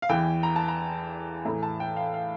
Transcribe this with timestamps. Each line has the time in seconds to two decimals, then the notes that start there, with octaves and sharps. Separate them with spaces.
0.02 F5
0.09 E2 E3 G5
0.43 A#5
0.56 A5
0.68 A#5
1.45 A2 E3 A#5
1.63 A5
1.80 G5
1.96 F5
2.14 F5